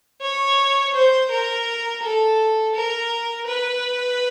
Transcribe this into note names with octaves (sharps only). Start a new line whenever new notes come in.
C#5
C5
A#4
A4
A#4
B4